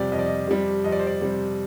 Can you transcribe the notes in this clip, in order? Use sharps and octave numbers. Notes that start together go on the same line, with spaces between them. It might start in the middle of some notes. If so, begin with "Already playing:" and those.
Already playing: F2 C3 G3 F4 G4 D5
F2 D#5
D5
D#5
C3 G3
F2 D#5
D5
C5
D5
C3 G3